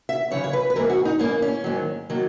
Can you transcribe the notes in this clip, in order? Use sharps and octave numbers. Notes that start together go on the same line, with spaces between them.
E5
F#2 C#3 E3 C#5
C#5
B4
B4
G#2 E3 A#3 A#4
F#4
D#4
G#2 E3 A#3 C#4
C#4
G#2 D#3 F#3 A#3
D#3 F#3 A#3